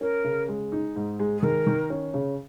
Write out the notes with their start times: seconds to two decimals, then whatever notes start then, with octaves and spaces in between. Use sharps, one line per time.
0.01 C#4 A#4
0.24 C#3
0.48 G#3
0.72 D#4
0.96 G#2
1.19 G#3
1.38 G#4
1.42 D#3 A#4
1.67 D#3
1.90 C#4
2.14 C#3